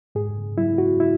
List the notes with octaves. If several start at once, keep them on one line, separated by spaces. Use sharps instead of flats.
G#2 G#4
F#3 E4
F#4
E4